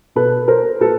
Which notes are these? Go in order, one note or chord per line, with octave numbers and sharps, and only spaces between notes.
B2 A4 B4
A#4 C5
A#2 A4 B4